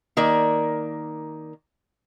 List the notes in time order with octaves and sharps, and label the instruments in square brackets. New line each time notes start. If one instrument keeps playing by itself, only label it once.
[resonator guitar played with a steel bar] D#3 A#3 A#4 D5